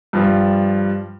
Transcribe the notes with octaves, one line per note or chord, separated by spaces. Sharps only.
G2 F3 G3